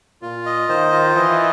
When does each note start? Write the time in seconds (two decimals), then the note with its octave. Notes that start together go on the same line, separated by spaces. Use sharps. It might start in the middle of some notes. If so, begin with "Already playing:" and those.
0.22 A#2 F4
0.46 D#5
0.69 D#3 C5
0.92 F4
1.16 E3 D#5